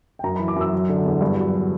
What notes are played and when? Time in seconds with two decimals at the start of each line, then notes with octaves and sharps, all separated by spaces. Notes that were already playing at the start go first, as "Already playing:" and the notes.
0.19 G5
0.23 F#2 A#5
0.36 E3 B5
0.48 D6
0.56 F#2 E6
0.73 F#3
0.89 D3
1.05 E2
1.21 G2
1.37 F#3